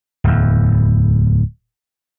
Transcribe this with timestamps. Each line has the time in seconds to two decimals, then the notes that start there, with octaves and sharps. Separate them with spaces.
0.24 D1 E2